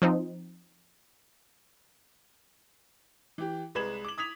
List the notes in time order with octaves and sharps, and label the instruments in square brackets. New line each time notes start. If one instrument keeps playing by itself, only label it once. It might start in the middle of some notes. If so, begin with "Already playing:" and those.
[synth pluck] F3 C4 D#4
[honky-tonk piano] E3 G4
C2 G#3 B4 G#6 E7 F#7
D6 F#7
D#6 G#6 B6 F7